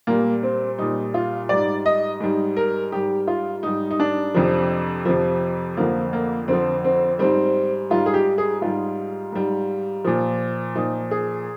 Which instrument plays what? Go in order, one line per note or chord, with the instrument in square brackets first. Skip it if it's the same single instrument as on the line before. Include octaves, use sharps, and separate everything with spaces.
[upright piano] A#2 G3 A#3
C4
A#2 G3 D#4
F4
G#2 G3 D5
D#5
G#2 G3
A#4
G#2 G3 G4
F4
G#2 G3 D#4
D#4
D4
F2 C3 F3
F2 C3 F3
F2 D3 F3 A#3
A#3
F2 D3 F3 C4
C4
G#2 G3 C4
G#2 G3 F4
G#4
G4
G#4
G#2 G3 F4
G#2 G3
A#2 F3
A#2 F3 D#4
G#4